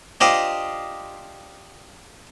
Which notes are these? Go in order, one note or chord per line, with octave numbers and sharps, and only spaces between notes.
D4 F4 G4 C5 D#5